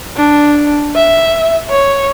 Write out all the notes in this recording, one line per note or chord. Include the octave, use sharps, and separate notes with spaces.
D4
E5
C#5